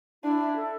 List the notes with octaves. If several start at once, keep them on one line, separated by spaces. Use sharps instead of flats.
D4 E4
E5
A4